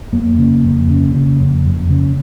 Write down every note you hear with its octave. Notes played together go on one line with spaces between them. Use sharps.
F2 A#3
C#3
F2
C#3
C#3
F2
F2
C#3